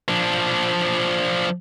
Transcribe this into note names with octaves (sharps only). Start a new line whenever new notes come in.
F3 D4